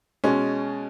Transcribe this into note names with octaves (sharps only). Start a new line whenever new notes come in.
B2 G#3 C#4